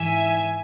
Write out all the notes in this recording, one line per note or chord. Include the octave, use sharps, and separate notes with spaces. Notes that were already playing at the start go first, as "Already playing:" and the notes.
Already playing: G#2 E3 E5 G#5